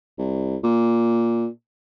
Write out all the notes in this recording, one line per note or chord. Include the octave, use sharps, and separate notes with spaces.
C2
A#2